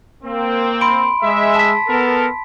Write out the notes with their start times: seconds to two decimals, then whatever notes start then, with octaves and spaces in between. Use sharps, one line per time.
0.24 A#3 C4
0.81 B5 C6 D7
1.22 G#3 E5
1.55 A5 B6
1.88 B3 A4 A#4